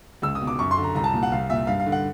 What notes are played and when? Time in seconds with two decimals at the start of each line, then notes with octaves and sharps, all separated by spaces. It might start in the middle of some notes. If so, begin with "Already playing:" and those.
0.22 C#2 E6
0.35 D#6
0.41 B2
0.47 D6
0.59 F#2 C#6
0.71 C6
0.78 D3
0.83 A#5
0.95 C2 A#5
1.04 A5
1.14 A#2
1.23 F#5
1.32 C2 F5
1.50 A#2 E5
1.67 G2 F5
1.80 F5
1.86 D3
1.92 F#5